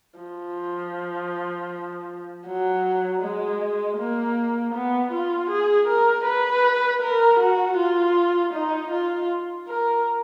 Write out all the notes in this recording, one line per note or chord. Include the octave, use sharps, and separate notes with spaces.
F3
F#3
G#3
A#3
B3
F4
G#4
A#4
B4
A#4
F#4
F4
D#4
F4
A#4